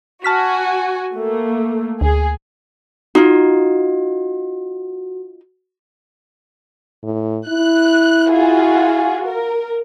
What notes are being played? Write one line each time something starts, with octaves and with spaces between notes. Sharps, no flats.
F#4 G#5 A5 F6 B6
A3 A#3
D2 G#4
D#4 F4 F#4
A2
E4 F#6
F4 F#4 G#4
A#4